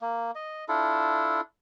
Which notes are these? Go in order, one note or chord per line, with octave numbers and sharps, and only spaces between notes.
A#3
D#5
D4 E4 F4 A4